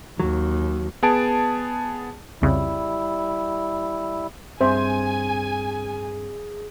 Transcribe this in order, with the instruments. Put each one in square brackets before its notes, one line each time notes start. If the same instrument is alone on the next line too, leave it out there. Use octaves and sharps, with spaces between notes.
[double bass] D#2 [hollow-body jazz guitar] F#3
[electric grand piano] B3 G#4 A5 D7
[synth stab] C2 F2 C#3 [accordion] G3 E4
[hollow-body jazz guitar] G2 C4 E5 [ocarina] G#4 [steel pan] C5 [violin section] G#5